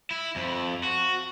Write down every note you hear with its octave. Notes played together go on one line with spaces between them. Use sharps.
E4
F2
F#4